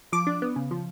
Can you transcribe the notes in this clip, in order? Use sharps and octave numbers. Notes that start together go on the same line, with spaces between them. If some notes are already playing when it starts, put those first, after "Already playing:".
F3 D6
D4
B3
C#3
F3